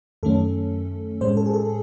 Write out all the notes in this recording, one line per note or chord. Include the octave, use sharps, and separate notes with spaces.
F#2 D#3 A3 C#4 A4
A2 G#3 C#4 C5
A4
G#4
A4